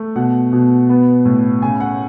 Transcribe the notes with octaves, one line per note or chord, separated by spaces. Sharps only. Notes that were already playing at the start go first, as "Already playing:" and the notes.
Already playing: A3
B2 F#5
B2
B3
A2
C#3 G#5
F#5